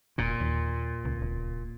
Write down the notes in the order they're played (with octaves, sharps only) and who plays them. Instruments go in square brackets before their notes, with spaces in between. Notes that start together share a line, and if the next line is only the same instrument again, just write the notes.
[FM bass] E1 [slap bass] A#2
[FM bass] D#2
C#2
D1